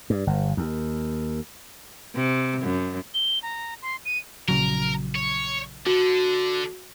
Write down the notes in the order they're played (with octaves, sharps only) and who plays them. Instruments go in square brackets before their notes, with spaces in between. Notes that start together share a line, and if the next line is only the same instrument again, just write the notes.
[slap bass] G2
G1
D#2
[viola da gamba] C3
F#2
[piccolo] G7
A#5
C6
D#7
[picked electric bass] A#1 C#3 F#3 [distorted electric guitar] A#4
[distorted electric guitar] C#5
[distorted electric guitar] D3 [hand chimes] F#4